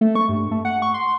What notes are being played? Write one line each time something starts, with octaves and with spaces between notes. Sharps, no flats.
A3
C#6
G2
A3
F#5
C#6
C6